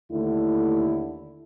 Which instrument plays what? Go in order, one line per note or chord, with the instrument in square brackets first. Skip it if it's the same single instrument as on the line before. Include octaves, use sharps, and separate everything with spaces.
[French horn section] D#2 D3 A3 E4